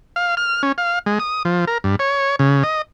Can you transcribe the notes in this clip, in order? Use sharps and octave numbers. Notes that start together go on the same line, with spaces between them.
F5
F6
C#4
F5
G#3
D#6
F3
A#4
G2
C#5
C#3
D#5